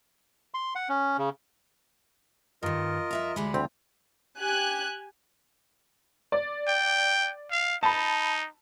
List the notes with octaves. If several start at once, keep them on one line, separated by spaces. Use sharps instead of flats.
C6
F#5
C#4
C#3
G2 D#3 F4 A#4 D#5
F2 E5 A#5
D2 G3 G#3 B5
D2 C4 F4
G4 G#5 F#6
D5
G5
F5
D#4 A5 B5